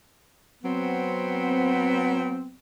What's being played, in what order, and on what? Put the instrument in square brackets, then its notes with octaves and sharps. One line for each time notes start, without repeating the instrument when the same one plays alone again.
[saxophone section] F#3 B3 C4